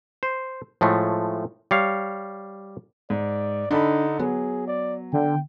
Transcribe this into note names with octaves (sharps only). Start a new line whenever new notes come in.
C5
A2 F3 G#3 A3
G3 C#5 F5
G#2 D5
D3 D4 D#4 A4 B5
F#3 B3 G#4
D5
D3 G5